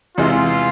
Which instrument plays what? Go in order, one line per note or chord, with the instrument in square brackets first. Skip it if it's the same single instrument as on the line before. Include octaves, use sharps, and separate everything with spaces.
[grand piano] E2 C3 E3 G#3 [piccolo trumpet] F4